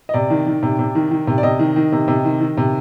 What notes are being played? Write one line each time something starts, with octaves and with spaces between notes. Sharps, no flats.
D#5
C3 D5
D#3
D#3
C3
C3
D#3
D#3
C3
D5
C3 D#5
D#3
D#3
C3
C3
D#3
D#3
C3